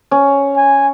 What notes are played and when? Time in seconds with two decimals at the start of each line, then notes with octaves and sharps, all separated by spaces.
0.11 C#4
0.57 G#5